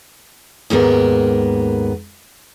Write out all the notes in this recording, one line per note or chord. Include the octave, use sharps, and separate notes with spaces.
D#2 G#2 A#3 B3 A#4